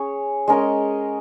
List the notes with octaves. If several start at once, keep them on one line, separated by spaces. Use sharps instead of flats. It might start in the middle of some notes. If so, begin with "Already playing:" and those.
Already playing: C#4 G#4 C#5
G#3 C#4 A#4 D#5